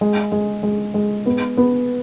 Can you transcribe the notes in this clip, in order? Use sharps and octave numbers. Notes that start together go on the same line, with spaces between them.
G#3
G#3
G#3
G#3
B3
B3